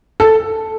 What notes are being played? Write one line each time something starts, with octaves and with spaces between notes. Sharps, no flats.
A4